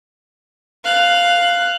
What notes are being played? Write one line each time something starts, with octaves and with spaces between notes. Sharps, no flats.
F5 F#6